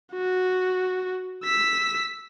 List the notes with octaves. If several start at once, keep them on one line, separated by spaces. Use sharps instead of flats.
F#4
E6 B6